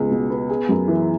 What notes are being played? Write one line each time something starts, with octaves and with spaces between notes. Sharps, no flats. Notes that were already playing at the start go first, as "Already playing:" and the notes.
Already playing: C#2 B3 G#4
B2
B3
G#4
F#2
E3